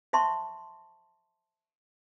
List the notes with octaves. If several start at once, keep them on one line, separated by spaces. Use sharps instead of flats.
C5 E5 A5 C6 C#6